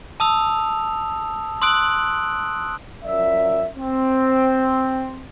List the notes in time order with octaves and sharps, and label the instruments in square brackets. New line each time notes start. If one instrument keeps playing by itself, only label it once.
[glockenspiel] A5 D#6 E6 F7
C6 D#6 E6 F#6 D7 F#7
[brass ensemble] F#2 F3 D5 E5
C4